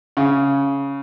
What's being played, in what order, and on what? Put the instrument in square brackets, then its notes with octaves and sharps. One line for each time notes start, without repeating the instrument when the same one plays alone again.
[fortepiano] C#3